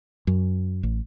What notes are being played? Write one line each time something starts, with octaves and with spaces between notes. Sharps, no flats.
F#2
A1